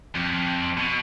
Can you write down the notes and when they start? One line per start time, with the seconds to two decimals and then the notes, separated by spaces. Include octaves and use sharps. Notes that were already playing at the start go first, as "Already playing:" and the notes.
0.15 F2
0.77 B2